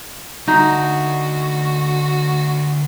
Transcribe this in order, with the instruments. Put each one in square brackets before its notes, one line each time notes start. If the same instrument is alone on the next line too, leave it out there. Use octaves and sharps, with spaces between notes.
[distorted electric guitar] D2 [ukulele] D#4 [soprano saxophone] F#4